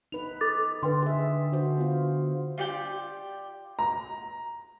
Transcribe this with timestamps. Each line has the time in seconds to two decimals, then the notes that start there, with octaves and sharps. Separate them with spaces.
0.12 D#4 B4 F7
0.41 A4 D6 A6
0.83 D3 B4 G5 C6
1.02 G#4 E5
1.52 D3 F#4 C5
1.78 B3 F4
2.58 F4 G4 D5 G5
3.79 A#5